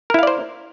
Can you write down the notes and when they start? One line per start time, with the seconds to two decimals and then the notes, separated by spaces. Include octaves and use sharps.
0.10 A#4
0.14 E4
0.19 F5
0.23 D5
0.27 C5